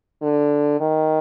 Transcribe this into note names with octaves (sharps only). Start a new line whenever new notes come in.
D3
D#3